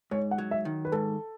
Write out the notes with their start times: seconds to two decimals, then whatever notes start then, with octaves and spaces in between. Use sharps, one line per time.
0.11 G#2 C#5
0.31 F#5
0.38 F#3
0.51 E5
0.65 D#3
0.85 B4
0.92 G#2 A4